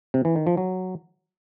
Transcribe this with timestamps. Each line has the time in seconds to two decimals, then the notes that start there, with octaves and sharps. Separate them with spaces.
0.14 C3
0.25 E3
0.36 D#3
0.47 F3
0.57 F#3